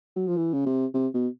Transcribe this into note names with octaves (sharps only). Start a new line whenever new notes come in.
F#3
F3
E3
C#3
C3
C3
B2